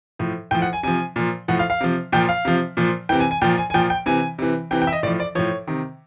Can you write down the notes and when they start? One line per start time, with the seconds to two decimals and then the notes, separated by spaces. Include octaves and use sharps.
0.19 A2 F3
0.51 A2 F3 G5
0.62 F#5
0.73 G#5
0.83 C3 F3 G#5
1.16 A#2 F3
1.48 A2 F3 F#5
1.59 F5
1.70 F5
1.81 C3 F3
2.12 A#2 F3 G5
2.29 F5
2.45 C3 F3
2.77 A#2 F3
3.09 C3 E3 G5
3.20 G#5
3.31 G#5
3.42 A#2 F3 G5
3.58 G#5
3.70 G#5
3.74 A#2 F3 G5
3.90 G5
4.06 C3 E3 G#5
4.39 C3 E3
4.71 C3 E3 G5
4.82 G5
4.87 E5
4.92 D#5
5.03 A2 D5
5.07 F3
5.20 D5
5.35 A2 F3 C#5
5.67 C3 D#3